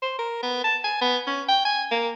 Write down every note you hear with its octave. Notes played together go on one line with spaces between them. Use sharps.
C5
A#4
B3
A5
G#5
B3
C#4
G5
G#5
A#3